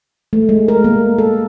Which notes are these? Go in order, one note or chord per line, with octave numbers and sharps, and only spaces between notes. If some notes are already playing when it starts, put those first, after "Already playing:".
A3
G#3
A#4
A#3
A4